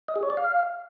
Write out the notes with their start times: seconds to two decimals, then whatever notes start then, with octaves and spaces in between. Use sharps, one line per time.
0.08 D#5
0.16 G#4
0.23 C#5
0.30 D5
0.37 F5